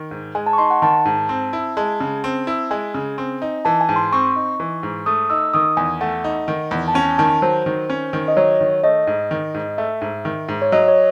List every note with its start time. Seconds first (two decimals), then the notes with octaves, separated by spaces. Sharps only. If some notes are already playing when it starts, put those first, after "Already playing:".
Already playing: D#3
0.11 G#2
0.35 G#3 G#5
0.47 A5
0.53 C#6
0.58 D#4 C6
0.71 F#5
0.82 D#3 A5
1.05 G#2
1.29 C4
1.53 E4
1.77 G#3 A5
2.00 C#3
2.24 C4
2.47 E4
2.71 G#3 G#5
2.94 C#3
3.18 C4
3.42 D#4
3.65 E3 A5
3.81 G#5
3.89 G#2
3.96 C6
4.12 C4 C#6
4.36 D#4
4.60 E3
4.83 G#2
5.06 A3 D#6
5.30 D#4 E6
5.54 D#3 D#6
5.77 E2 G#5
6.01 A3 F#5
6.24 D#4
6.48 D#3
6.71 E2
6.88 A5
6.95 C#4 G#5
7.18 D#3 A5
7.42 F#3 C5
7.66 D#3
7.90 C#4
8.13 D#3
8.28 D#5
8.37 F#3 C#5
8.61 D#3
8.84 A3 D#5
9.07 G#2
9.31 D#3
9.54 G#2
9.78 A3 E5
10.01 G#2
10.25 D#3
10.48 G#2
10.62 C#5
10.72 F#3 D#5
10.88 C#5